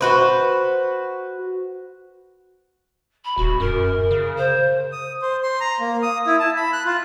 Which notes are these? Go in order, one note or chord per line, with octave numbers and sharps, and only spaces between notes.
F#4 B4 C5
B5
D#1 F#4
F#2 A#4
C#3
C5
D#6
C5
C6
A#5
A#3
D#6
E4
A5
B5
F#6
F4